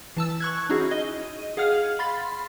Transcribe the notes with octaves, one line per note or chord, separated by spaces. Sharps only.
E3 A5 E6
C#6 F#6 G#6
C#4 D#4 E4 F#4 G#4
D#5
G#4 F5 F#5 F6
B5 C6 A6